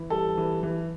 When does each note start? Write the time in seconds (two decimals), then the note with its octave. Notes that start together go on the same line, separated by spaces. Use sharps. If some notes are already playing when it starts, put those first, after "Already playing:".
Already playing: E3
0.10 G3 A4
0.38 E3
0.63 E3